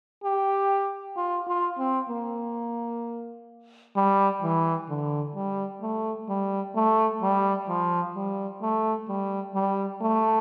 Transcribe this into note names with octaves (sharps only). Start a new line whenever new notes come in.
G4
F4
F4
C4
A#3
G3
E3
D3
G3
A3
G3
A3
G3
F3
G3
A3
G3
G3
A3